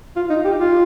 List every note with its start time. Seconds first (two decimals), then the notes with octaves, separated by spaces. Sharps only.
0.16 F4
0.30 D#4
0.45 G4
0.59 F4